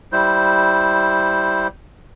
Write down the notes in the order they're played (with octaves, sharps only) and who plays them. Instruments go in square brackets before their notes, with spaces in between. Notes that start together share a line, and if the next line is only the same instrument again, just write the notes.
[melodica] G3 E4 C5